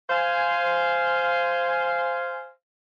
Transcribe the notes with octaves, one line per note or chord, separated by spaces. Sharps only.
C5 F5 G#5